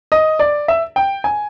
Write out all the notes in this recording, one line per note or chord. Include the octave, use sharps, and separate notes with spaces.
D#5
D5
E5
G5
G#5